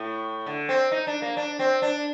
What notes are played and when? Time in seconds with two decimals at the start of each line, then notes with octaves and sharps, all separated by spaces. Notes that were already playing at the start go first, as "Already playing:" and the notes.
Already playing: A2
0.46 D3
0.69 C4
0.92 D#4
1.07 D4
1.22 A#3
1.37 D4
1.59 C4
1.82 D4